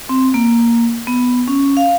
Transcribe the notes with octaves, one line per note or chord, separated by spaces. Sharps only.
C4
A#3
B3
C#4
F5